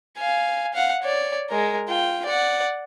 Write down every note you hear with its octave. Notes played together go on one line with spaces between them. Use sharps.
F5 G#5
F5 F#5
C#5 D5
G#3 A#4
F4 G5
D5 F#5